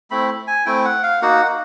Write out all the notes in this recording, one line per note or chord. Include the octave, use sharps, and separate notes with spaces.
A3 C4 E4 B5
G#5
A3 C4 E4 G5
F#5
F5
A#3 D#4 F#4 F#5